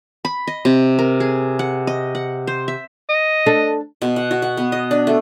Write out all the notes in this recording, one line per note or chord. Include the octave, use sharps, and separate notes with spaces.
B5
D#5
C3
A#4
G#4
F#5
D#5
F#5
C5
E5
D#5
D4 A4
B2
F#5
F#4
F#5
B3
D#5
D4
A3